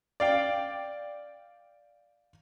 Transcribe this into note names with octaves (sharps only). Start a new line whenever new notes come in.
D5 F5 G5